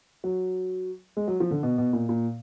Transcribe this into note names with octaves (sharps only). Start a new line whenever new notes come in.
F#3
G#3
F#3
F3
D3
B2
B2
A#2
A#2